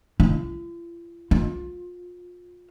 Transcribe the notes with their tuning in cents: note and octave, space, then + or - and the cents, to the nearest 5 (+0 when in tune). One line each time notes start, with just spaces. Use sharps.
F4 -45
F4 +25